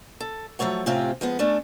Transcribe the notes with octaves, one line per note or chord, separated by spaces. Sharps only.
A4
F3 F#3 A3 C#5 F#5
A2 C3 C4 C#4 F4 G4
F3 G#3 B3
A3 C#4 D4